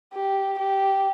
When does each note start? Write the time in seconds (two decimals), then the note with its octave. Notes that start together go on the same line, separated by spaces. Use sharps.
0.13 G4
0.59 G4